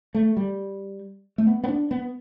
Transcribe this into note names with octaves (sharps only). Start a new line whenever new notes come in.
A3
G3
A3
B3
B3
D4
B3